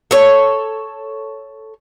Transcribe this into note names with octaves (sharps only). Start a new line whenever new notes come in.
A4 C#5